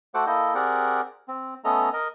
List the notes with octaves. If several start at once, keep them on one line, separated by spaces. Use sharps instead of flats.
A3 F#4 A4 C5 F#5 D6
A#3 E4 A4 D#5 G5
C4 G4 G#4 A#4 D5 F#5
C4
A3 B3 C#4 A4 D#5 A#5
A#4 D#5